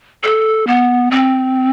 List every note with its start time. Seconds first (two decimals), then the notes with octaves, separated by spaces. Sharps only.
0.23 A4
0.67 B3
1.11 C4